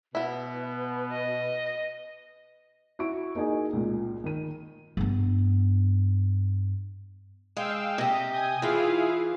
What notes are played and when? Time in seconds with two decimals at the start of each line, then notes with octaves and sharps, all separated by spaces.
0.15 B2 B3 E4 B4
1.12 D#5
2.99 E4 F#4 C#6 D7
3.35 A#3 D#4 F#4 G#4 D#5 G#5
3.73 C#2 A#2
4.24 D#3 D#7
4.97 G2 B3
7.57 G#3 F5 G5 E6
7.98 C3 G4 D#5
8.31 G#5 D#6 G6
8.62 E3 E4 F4 G#4 F5